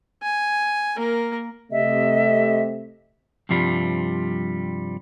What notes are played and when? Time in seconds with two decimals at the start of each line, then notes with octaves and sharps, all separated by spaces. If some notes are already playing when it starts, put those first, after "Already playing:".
0.23 G#5
0.96 A#3 A#4
1.71 C3 A3 D#5 E5
3.49 G2 C3 F3 G3